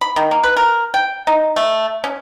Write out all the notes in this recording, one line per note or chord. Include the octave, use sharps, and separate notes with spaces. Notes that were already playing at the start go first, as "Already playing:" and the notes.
B5
D#3
A#3
B4
A#4
G5
D#4
A3
C#4